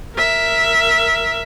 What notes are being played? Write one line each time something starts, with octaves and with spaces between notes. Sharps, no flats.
A#4 E5